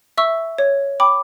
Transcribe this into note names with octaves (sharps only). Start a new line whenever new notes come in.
E5 C#6 E6
C#5
G5 B5 D6